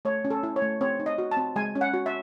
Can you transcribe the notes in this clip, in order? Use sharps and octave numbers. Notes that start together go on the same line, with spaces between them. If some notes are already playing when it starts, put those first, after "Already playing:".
A3 C#5
C#4
A4
E4
C#5
A3
C4 C#5
D#4
D#5
F#4
A5
C4
G#3 G#5
C#4
F#5
F#4
E5